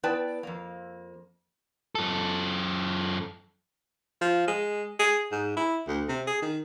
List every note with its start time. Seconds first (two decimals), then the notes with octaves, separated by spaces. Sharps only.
0.03 B3 E4 B4 D5 G5 A5
0.43 F2 A#3
1.95 F#2 A4
4.21 F3
4.48 G#3
4.99 G#4
5.32 G#2
5.57 E4
5.88 D2
6.09 C3
6.27 G#4
6.42 D#3